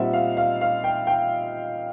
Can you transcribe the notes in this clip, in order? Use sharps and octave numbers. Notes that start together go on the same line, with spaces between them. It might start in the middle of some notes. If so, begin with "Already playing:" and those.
Already playing: A#2 G3 C4 D#4 E5 F#5
F5
F5
F5
G5
G5